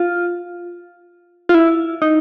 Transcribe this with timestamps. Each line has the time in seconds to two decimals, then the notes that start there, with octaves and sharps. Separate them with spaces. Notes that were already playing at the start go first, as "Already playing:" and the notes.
Already playing: F4
1.49 F4
1.54 E4
2.02 D#4